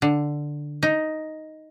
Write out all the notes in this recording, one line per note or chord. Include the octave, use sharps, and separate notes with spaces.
D3
D#4